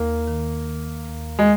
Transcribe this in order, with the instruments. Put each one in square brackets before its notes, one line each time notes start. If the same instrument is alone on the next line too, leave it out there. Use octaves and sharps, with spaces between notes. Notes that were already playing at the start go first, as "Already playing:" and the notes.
Already playing: [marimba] D#2 [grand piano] A#3
[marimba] D#3
D#3
D#2
[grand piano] G#3